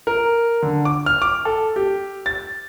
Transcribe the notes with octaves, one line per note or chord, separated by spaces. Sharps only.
A#4
D3
D6
F6
D6
A4
G4
A6